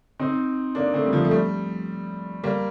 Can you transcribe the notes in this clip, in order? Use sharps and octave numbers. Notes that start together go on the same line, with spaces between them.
C4 D#4
A#3 D4
A3 C4
G3
F3
A3
G3
G3 A#3